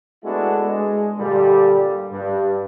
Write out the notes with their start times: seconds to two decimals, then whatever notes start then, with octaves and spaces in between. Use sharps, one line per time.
0.24 G#3 A3 B3 D4 E4 F#4
0.66 G#3
1.18 G2 A#2 D3 G3
2.11 G2